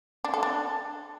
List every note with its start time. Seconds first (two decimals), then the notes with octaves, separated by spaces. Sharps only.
0.24 D4
0.34 A4
0.43 D4